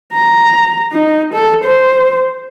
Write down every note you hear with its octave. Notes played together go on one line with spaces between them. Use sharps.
A#5
D#4
A4
C5